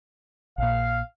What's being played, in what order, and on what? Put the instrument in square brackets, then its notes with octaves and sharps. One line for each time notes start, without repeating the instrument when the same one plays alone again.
[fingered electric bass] A#1 A#2 [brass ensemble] F5